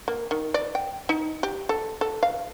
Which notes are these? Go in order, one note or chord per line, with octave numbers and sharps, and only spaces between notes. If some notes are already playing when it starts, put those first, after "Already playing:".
A#3
D#3
D5
G5
D#4
G4
A4
A4
F5